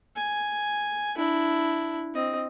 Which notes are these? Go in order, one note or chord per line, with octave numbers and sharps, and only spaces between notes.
G#5
D4 E4
C4 D#5